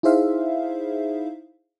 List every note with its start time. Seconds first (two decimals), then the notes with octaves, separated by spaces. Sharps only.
0.03 D#4 E4 G#4 C5 E5 F5